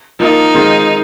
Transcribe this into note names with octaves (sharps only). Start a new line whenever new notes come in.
F3 A#3 D#4 F4 A#4
D#3 G#3 C4 F4